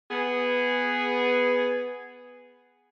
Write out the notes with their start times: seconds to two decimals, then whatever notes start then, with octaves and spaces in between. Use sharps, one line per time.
0.11 B3 G#4